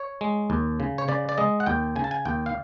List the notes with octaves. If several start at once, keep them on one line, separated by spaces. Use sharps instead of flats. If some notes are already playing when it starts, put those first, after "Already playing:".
Already playing: C#5
G#3
D#2
C#3
C#5
C#3 D5
D5
G#3 D#5
F#5
D#2 G5
C#3 G#5
A5
G#5
D#2 G5
F5